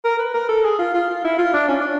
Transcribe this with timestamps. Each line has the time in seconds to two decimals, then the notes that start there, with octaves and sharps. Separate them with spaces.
0.04 A#4
0.19 B4
0.34 A#4
0.49 A4
0.64 G#4
0.79 F4
0.94 F4
1.09 F4
1.24 E4
1.38 F4
1.54 D4
1.68 C#4
1.81 D4